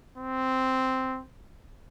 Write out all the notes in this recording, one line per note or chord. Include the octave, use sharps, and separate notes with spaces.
C4